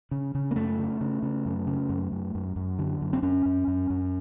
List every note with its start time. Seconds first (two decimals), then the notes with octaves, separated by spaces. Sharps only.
0.11 C#3
0.35 C#3
0.51 A#3
0.56 F#2 A3
0.79 C#3
1.01 C#3
1.23 C#3
1.45 F#2
1.67 C#3
1.89 F#2
2.12 F#2
2.35 F#2
2.56 F#2
2.79 D3
3.02 F#2
3.13 C4
3.23 F#2 C#4
3.46 F#2
3.68 F#2
3.90 F#2